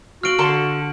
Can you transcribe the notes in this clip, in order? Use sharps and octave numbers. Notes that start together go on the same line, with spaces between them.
F#4 F5 C6 F6 D7 F#7
D3 A4 A5 C6